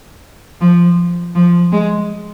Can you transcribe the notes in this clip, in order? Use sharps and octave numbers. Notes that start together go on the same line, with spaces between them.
F3
F3
G#3